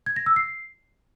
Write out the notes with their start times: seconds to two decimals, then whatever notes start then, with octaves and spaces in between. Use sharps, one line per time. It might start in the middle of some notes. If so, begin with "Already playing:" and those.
0.06 G#6
0.16 A#6
0.26 E6
0.36 C7